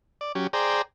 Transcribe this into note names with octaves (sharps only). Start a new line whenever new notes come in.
D5
F#3 C#4 G4
G#4 C5 D5 G5 A#5